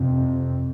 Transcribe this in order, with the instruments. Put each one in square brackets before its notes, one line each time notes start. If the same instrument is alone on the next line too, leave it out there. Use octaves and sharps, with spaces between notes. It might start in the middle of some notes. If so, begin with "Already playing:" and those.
Already playing: [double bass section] F2 C3